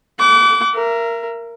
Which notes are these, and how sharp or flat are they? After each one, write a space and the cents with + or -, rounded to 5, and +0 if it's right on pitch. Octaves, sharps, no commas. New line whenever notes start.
F#5 +30 D6 -30
A#4 +0 E5 +35